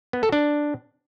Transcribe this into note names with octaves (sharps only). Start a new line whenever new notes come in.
B3
A4
D4